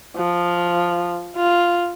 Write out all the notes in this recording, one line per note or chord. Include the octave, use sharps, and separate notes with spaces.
F3
F4